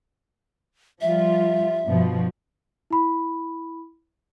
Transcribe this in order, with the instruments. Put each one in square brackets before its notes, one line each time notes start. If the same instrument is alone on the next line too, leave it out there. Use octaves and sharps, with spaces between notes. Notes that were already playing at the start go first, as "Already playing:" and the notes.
[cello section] F3 G3 F4 [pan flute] E5
[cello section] G2 B2 F3
[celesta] E4 B5